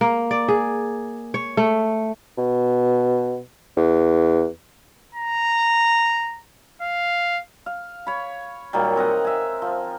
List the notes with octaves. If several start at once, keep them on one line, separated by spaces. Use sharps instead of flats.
A#3
D5
G#4
C#5
A3
B2
E2
A#5
F5
F5
C#5 B5
A#2 D#3 F#3 G3
C4 A#4 D#5 F#5
E5 G#5
F3